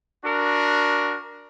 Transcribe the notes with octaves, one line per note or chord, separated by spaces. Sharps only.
D4 F#4 A#4